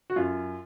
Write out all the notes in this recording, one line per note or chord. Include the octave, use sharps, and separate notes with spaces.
F#4
F#2 F4